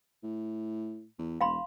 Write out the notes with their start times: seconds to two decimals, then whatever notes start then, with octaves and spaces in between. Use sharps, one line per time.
0.23 A2
1.19 E2
1.41 E1 F5 B5 C6